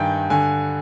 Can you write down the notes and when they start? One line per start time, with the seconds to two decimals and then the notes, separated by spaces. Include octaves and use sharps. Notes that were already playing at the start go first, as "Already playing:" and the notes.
Already playing: G2 D#3 G5 G#5
0.30 D3 G#5